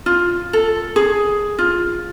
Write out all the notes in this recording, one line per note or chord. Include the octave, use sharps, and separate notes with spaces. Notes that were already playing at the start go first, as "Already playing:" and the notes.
F4
A4
G#4
F4